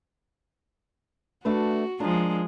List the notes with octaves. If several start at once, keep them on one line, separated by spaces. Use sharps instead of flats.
A3 D4 F#4 B4
F3 G#3 D4 A#4 D#5